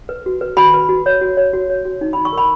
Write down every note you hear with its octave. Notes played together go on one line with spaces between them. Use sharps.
B4
F#4
B4
F#4 B5
B4
F#4
C#5
F#4
C#5
F#4
C#5
F#4
D#4
B5
D#4
C#6
A#4 B5